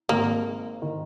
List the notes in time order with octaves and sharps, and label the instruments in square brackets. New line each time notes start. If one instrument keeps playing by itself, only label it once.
[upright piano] G#1 G#2 D#3 [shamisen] A#3
[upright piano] D#3